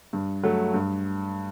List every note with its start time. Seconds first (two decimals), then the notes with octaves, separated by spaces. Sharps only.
0.13 G2
0.43 F#3 A3
0.74 G2